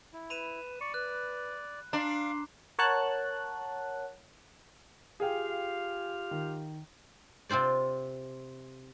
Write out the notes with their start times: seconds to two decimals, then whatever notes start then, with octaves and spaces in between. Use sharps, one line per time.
0.13 E4
0.30 B4 B5 D#7 E7
0.81 D5 C#6
0.94 B4 F#6
1.93 D4 F5 A#5 C6
2.79 A#4 C#5 F#5 A5 F#6
5.20 F4 G4 G#4 F5 G5
6.31 D#3
7.49 C3 C4 F4 C5 D5